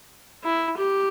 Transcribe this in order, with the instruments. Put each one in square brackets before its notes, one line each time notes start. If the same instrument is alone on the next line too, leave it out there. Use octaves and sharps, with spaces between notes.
[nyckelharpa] E4
G4